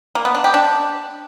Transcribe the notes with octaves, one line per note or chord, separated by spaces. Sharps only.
A#3
B3
D4
G4
D4